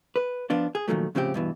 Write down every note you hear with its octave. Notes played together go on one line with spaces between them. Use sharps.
B4
F3 B3 D4 F4
G#4
A#2 D#3 F3 F#3 A3
A2 C#3 F3 C4 G4
G2 B2 E3